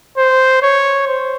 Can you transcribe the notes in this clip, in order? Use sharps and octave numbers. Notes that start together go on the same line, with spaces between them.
C5
C#5
C5